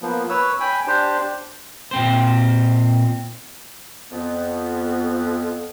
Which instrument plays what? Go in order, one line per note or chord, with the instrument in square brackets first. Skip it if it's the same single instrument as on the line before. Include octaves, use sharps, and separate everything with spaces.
[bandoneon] F3 A#3 B3
B4 C#5 E6
G5 G#5 B5
D4 G4 C5
[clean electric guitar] A#2 C4 C5
[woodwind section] F2 B3